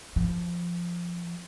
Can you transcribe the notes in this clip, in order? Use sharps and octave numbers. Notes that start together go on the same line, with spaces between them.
F3